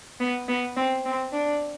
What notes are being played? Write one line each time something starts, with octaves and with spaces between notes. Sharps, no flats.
B3
B3
C4
C4
D4